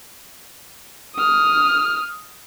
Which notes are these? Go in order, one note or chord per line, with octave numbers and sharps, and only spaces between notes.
D#6 F6